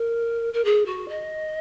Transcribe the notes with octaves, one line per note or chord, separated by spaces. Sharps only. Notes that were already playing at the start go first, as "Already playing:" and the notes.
Already playing: A#4
A#4
G#4
F#4
D#5